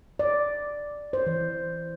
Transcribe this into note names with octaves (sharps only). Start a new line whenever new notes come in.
D5
C5
E3